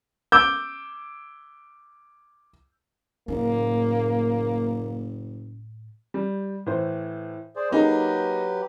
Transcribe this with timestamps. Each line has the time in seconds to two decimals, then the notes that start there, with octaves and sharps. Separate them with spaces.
0.32 D6 E6 G6
3.28 F#1 A2 A#3
6.14 G3
6.66 A2 E3 C5
7.56 G#4 C5 D5
7.71 F#3 A#3 D#4 G4 G#4 B4